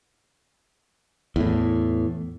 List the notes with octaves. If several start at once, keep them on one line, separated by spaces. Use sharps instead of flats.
E2 A2